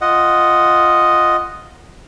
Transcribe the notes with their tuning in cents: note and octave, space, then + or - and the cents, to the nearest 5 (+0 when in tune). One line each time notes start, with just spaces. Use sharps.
F4 +0 D#5 +0 F#5 +0